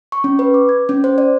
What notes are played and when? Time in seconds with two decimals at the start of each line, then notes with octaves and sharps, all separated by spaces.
0.12 C#6
0.24 C#4
0.39 B4
0.54 D6
0.69 G#6
0.89 C#4
1.04 C5
1.18 D5